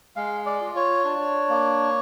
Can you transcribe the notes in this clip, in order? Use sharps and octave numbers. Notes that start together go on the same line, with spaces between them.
G#3 F5
D5
F4
C#5
D4
A#3